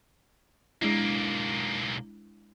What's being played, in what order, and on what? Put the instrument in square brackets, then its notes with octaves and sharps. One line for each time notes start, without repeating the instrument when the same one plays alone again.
[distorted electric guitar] B1 A#3 [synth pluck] G#3 D4 E4